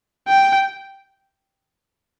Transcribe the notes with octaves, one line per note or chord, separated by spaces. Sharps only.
G5